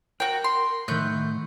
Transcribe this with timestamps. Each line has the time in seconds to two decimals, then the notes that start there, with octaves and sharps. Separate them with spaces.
0.20 F#4 A#4 G5
0.44 C6
0.88 A2 D#3 A3 F#5 G6